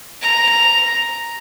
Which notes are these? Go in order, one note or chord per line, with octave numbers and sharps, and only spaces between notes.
A#5